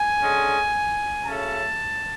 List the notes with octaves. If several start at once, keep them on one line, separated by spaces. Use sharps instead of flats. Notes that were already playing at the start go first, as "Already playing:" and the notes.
Already playing: G#5
D3 G#3 C#4
C#3 F#3 A3 C#4 A5